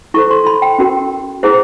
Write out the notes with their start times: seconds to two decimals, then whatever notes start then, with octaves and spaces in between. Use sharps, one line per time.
0.14 E4 A4 C5 C#6
0.31 C6
0.47 B5
0.62 G5
0.79 C#4 F#4 A#4
1.43 E4 G#4 C5